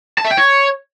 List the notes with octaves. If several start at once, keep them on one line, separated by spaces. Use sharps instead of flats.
A5
E5
G5
C#5